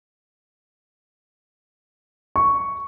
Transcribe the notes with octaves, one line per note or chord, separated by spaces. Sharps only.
C#6